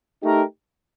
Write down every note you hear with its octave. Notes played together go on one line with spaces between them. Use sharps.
A3 D#4 G4 A#4